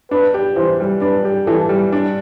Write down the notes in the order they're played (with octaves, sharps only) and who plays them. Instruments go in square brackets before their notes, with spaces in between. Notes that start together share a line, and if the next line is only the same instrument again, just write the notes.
[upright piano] D4 [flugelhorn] B4
[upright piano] G4
[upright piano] E3 [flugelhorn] C5
[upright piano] G3
[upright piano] D4 [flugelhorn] B4
[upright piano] G4
[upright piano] E3 [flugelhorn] A4
[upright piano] G3
D4